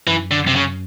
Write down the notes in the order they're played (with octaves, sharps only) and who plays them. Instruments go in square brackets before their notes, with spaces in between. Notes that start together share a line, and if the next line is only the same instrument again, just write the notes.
[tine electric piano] F#2 [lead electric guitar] E3
[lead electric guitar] D3
[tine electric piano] F#2 [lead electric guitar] C3
[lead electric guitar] C#3